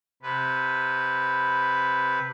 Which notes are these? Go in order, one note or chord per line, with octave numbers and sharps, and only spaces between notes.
C3 B4